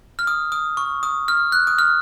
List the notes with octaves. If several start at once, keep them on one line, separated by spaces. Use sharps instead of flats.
F6
D#6
D#6
C#6
D#6
F6
F#6
D#6
F6